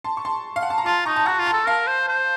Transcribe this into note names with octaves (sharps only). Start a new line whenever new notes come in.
A5 C6
C#6
A5 C6
F5
F#5
A5
A#5
F4 A5 C6
D#4 A#5 C#6
A5 C6
F#4 F#5 A#5
F4
A5 C6
A4
A#4 F5 A5
C5
C5